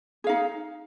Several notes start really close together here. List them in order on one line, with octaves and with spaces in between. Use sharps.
G#4 F5 D#4